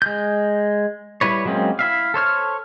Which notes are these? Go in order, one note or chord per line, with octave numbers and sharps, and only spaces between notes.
G#3 G6
G3 E4 B4 C#5
F#3 G#3 A#3 C4 C#4
E4 E5 F5
A4 C5 C#5 F6